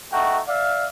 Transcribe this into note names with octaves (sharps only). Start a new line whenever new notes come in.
A3 D#4 F#4 G5
D5 E5 F5